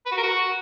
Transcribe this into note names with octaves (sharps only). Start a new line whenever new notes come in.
B4
F#4
A#4
F#4